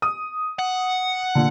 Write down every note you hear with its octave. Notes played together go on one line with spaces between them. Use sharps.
D#6
F#5
A#2 D3